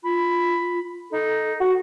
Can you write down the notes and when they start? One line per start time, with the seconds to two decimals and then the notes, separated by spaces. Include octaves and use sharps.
0.04 F4 B5
1.11 D#4 A4
1.60 F#4